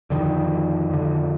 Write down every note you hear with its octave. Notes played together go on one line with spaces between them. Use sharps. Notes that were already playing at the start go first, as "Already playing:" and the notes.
F2 D3 D#3
F2 D3